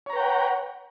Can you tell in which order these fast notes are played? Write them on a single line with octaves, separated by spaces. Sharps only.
C#5 A#5 B4 G5 F#5